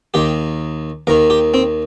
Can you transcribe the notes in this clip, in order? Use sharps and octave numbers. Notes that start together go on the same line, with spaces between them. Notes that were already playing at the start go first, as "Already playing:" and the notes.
D#2 D#3 G4
D#2 D#3 A#4
G4
C4